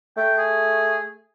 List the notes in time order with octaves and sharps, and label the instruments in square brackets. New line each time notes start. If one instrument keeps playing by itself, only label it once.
[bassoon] A3 [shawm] G5
[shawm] G#4